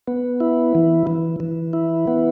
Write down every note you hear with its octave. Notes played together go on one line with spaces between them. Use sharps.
B3
E4
E3
E3
E3
E4
B3